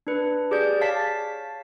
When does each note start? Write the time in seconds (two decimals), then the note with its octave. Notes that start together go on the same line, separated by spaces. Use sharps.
0.07 D4 B4
0.51 G4 G#4 D5 G6
0.81 C#5 F5 A5 A6 B6